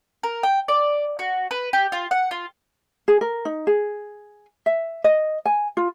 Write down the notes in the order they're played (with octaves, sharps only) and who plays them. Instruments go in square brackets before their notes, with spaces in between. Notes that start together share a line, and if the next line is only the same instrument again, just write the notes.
[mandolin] A#4
G5
D5
F#4
B4
G4
F4
F#5
F4
[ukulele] G#4
A#4
D#4
G#4
E5
D#5
G#5
F4